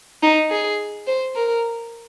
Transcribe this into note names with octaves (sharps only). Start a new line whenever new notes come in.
D#4
G#4
C5
A#4